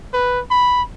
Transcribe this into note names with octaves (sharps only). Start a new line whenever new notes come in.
B4
B5